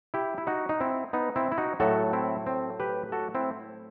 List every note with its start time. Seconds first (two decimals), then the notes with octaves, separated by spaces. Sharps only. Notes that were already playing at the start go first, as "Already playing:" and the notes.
0.14 E4 G4
0.38 E4
0.47 D#4 F#4
0.69 D#4
0.80 C4 E4
1.13 B3 D#4
1.36 C4 E4
1.52 E4
1.58 D#4 F#4
1.80 A2 F#3 A3 F#4 A4
2.13 C4 E4
2.46 C4
2.80 G4 B4
3.12 F#4 A4
3.35 C4 E4